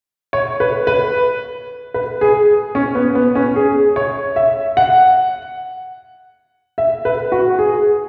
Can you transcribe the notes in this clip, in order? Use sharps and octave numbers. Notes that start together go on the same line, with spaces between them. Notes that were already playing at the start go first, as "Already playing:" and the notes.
C#5
B4
B4
B4
G#4
C#4
B3
B3
C#4
G#4
C#5
E5
F#5
E5
B4
F#4
G#4